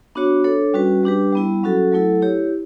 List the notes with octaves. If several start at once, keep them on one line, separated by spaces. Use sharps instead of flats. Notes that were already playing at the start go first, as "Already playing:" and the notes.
B3 D4 F#4 C#5
D4 A4 C#5
G3 C#4 F#4 B4
G3 D4 G4 B4
G3 B3 E4
F#3 C#4 F#4 A4
F#3 A3 E4 A4
E4 G4 C#5